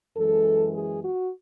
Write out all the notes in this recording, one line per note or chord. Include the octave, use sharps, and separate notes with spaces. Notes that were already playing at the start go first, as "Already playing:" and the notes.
F#2 E3 G#3 A4
G#4
F#4